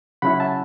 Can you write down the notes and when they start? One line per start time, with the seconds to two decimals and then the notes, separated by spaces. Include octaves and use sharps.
0.22 C#3 F#3 C#4 E4 F#5 B5
0.40 E5 A5